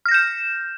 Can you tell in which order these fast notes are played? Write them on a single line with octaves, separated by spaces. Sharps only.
F6 A#6 G6 E7